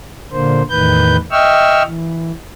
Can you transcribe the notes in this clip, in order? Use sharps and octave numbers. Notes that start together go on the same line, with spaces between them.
A#2 D3 A#3 C5
E2 A2 D#3 B4 G6
D#5 E5 G5 C#6 E6 F6
E3